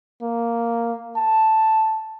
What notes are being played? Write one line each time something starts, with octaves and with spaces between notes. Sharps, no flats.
A#3
A5